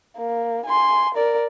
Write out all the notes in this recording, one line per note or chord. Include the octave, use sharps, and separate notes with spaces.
A#3
G#5 C6
A#4 D5